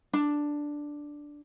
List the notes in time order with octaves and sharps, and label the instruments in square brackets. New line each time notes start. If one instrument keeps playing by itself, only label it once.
[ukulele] D4